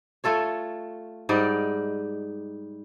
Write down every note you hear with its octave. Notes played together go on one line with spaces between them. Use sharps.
A3 F4 A4 C#5
G#2 G3 D#4 D5